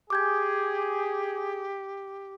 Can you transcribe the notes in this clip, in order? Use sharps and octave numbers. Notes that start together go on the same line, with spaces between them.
G4 G#4 D6 G6 G#6